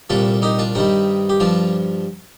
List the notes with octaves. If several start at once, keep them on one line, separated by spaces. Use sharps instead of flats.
C2 A#2 G3 F4 A4
D#4 G4
D4 F4
G2 D#3 G3 C4 D#4
G4
G2 F3 D4 F4